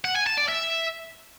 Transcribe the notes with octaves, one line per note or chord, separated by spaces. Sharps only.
F#5
G#5
A5
D5
E5